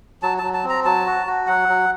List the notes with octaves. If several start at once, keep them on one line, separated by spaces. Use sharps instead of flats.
F#3 A5
F#3 A5
A5
C4
A#5
F#3 A5
F#4
F#4
F#3 F#5
F#3